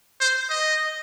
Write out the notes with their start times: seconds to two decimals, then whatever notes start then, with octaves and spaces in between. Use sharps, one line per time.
0.20 C5
0.50 D#5